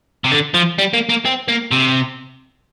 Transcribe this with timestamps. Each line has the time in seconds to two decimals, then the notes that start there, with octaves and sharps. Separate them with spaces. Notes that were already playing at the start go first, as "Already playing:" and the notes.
0.24 C3
0.32 D3
0.54 F3
0.78 G3
0.94 A#3
1.09 A#3
1.25 C4
1.48 A#3
1.72 C3